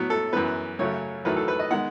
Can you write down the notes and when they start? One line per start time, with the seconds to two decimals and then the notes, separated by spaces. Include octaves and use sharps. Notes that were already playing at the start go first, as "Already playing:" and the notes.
Already playing: A2 F#3 B3
0.10 A4
0.33 F#2 E3 B3 B4
0.79 F#2 C#3 F#3 A3 C#5
1.25 E2 D#3 F#3 A3 B4
1.36 A4
1.48 B4
1.59 D#5
1.71 D#3 G#3 B3 F#5